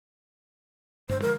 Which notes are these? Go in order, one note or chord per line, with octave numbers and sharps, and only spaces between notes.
D2 G2 C5
D3 F3 G#3 A#4